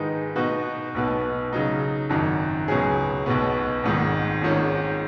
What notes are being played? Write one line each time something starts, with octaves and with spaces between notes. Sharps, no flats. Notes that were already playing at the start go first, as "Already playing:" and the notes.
Already playing: G#2 D#3 G#3 D#4 B4
B2 B3 D#4 F#4 B4
B1 B2 B3
C#3 F#3 D#4
G#1 F#2 D#3
C#2 B2 F#3 C#4 G#4
B1 B2 B3
G#1 G#2 D#3
G#1 G#2 D#3 G#3 C#4